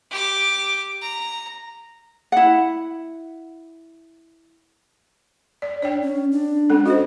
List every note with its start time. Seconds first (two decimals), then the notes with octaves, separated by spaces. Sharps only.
0.11 G4 D6
1.01 A#5
2.32 E4 F#5
5.62 D5
5.82 D4 C#5 D5 G5
6.02 C#4
6.32 D4
6.70 G#3 C#4 A4
6.86 F#4 C5 D#5